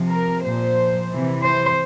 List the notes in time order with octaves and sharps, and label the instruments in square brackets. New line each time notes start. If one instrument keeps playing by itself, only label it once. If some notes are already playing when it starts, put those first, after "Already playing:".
Already playing: [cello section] C3 F3
A#4
A#2 F3 C5
C3 E3
C5